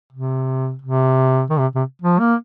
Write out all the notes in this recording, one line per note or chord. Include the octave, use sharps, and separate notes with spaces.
C3
C3
D#3
C3
C3
F3
A#3